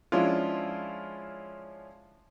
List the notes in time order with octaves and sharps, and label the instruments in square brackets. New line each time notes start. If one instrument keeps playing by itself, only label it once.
[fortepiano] F3 G#3 C#4 D4 E4 F4